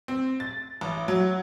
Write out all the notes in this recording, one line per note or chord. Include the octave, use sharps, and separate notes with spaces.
C4
A6
A1
F#3